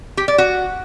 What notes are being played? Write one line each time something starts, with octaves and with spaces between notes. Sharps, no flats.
G4
D5
F#4